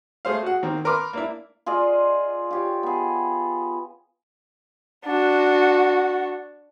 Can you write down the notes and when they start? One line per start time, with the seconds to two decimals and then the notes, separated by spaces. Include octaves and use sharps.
0.25 A3 G#4 C5 F5
0.43 F#4 G#4 F#5
0.63 D#3 A#3 C4
0.85 A#4 B4 C6 D6 F6
1.13 A#3 D4 E4
1.66 F4 G#4 D5 D#5
2.51 F4 G4 C#5
2.83 B3 G#4
5.05 D4 F#4